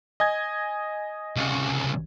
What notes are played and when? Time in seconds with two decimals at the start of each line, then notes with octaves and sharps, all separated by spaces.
0.20 D#5 G#5 G#6
1.37 C2 C#3